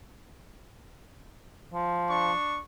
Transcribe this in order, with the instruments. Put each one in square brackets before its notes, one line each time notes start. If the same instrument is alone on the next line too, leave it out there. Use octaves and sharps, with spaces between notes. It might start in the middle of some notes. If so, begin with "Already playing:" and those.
[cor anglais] F3
[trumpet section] D4 C#6